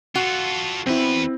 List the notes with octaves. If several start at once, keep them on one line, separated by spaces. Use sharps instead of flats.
F4 F#4 A4
E2 C4 E4 B4